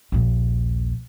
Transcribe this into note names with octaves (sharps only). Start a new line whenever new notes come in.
A#1 D#2